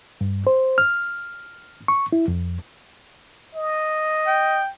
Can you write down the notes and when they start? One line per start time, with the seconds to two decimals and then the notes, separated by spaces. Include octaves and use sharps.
0.21 G2
0.47 C5
0.78 F6
1.88 C#6
2.13 E4
2.28 F2
3.55 D#5
4.27 G5